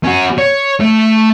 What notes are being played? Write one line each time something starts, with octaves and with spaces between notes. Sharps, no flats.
C#4 F#4
C#5
A3